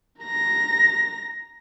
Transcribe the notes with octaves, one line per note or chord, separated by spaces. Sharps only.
A#5 A#6